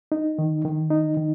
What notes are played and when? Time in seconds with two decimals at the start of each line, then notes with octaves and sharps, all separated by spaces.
0.12 D#4
0.38 D#3
0.65 D#3
0.90 D#4
1.17 D#3